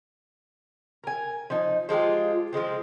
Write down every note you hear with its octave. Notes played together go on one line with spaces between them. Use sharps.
A#4 G#5
F3 D#4
F3 G#3 F4 G4
F3 F#3 G#3 C4